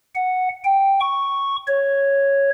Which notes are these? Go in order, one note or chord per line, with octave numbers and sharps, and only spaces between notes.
F#5
G5
C#6
C#5